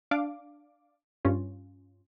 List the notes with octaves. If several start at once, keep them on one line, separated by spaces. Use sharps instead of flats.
D4 D5 F5 D6
G2 C#4 F4